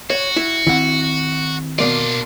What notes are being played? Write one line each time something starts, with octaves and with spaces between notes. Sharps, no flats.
F#4 C#5
E4
D#3 C4 E4 F#5
B2 A#3 D4 F4 D5